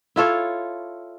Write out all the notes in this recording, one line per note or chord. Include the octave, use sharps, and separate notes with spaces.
E4 F4 A4 C#5